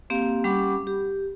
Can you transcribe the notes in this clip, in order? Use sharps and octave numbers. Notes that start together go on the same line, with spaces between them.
A#3 C4 G4 F5
G3 C#4 G4 F#5 B5 D6
G4